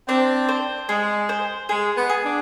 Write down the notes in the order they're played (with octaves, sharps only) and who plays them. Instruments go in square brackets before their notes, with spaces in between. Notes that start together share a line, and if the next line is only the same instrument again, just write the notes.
[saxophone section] C4 [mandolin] D4
[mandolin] C5
[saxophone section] G#3 [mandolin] G#4
[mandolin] C5
[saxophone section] G#3 [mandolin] G#4
[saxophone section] B3
[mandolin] G#4
[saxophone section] D4